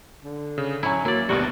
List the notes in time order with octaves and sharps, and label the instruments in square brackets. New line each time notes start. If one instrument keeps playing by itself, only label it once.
[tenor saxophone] D3
[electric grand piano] C#3
[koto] F#3 E4 [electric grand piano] C#4 C#5 G#5
[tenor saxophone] F#3 [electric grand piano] A#3 [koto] E4 D5
[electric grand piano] G#1 D2 B2 [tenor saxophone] G3 [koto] F#4